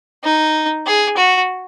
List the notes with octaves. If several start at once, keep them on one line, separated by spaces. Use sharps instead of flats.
D#4
G#4
F#4